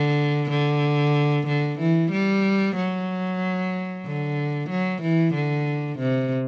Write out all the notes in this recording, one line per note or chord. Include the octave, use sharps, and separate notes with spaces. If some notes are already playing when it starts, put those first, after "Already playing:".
Already playing: D3
D3
D3
E3
G3
F#3
D3
F#3
E3
D3
C3